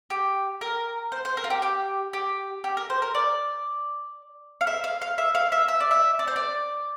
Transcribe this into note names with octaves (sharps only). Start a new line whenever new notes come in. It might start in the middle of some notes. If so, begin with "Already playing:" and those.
G4
A#4
C5
C5
A#4
F4
G4
G4
G4
G4
A#4
C5
A#4
D5
F5
E5
F5
F5
E5
F5
E5
E5
D5
E5
D5
C5
D5